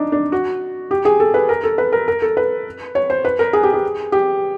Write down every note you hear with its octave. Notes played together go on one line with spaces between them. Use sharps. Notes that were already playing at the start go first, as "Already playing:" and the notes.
Already playing: D4 D#4
D4
F#4
G4
G#4
A4
B4
A#4
A4
B4
A#4
A#4
A4
B4
C#5
C5
B4
A#4
G#4
G4
G#4
G4